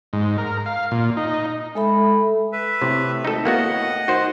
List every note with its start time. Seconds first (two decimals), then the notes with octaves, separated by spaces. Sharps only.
0.13 G#2
0.38 A#4
0.66 F5
0.91 A#2
1.17 D#4
1.75 G#3 A4 E5 B5
2.53 B4 E5
2.82 A2 C3
3.25 G#1 D#4 A4
3.45 A2 A#3 B3 F#4 D#5 F#5
4.08 D#3 F#4 C5